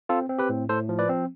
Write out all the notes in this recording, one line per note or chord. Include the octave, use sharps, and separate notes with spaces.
C4 F4 A4
C4
G4 B4
A2
A2 A4 C5
F3
B4 D5
C4